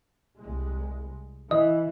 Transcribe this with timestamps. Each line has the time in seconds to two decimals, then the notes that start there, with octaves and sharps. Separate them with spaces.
0.39 C2 G#3
1.51 E3 D#5